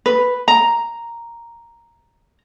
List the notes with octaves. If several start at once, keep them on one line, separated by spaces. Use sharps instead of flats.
B4
A#5